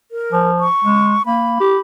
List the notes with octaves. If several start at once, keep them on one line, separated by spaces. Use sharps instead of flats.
A#4
F3
C#6
G#3
A#3 B5
G4